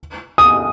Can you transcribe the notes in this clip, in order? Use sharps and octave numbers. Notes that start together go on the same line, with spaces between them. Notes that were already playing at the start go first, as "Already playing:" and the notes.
D#6